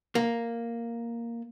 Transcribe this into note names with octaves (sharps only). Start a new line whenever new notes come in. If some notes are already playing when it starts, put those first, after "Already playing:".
A#3